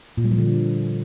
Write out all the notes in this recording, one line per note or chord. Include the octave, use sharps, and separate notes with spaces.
A#2
G3
F3
D3